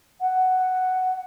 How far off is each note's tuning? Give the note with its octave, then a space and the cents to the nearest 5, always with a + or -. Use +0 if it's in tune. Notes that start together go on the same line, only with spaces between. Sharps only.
F#5 +5